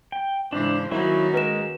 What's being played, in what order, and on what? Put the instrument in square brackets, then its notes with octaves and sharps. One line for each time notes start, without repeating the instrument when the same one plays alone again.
[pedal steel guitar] G5
[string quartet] G#2 C#3 E3 [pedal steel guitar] D4 [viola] C5
[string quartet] D#3 C#4 D#4 [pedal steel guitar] F#3 E4 [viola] A#3 F#4
[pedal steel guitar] G#3 A#4 [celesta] B4 E7